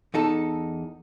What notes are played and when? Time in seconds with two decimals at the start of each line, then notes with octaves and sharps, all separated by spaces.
0.14 E2 D#4 A4